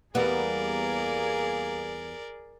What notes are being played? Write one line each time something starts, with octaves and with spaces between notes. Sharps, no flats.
E2 G3 A#3 B3 G#4 A#4 D5